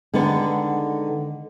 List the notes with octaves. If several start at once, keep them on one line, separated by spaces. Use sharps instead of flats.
D3 D#3 G#3 B3